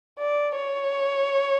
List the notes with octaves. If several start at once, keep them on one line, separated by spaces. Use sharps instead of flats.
D5
C#5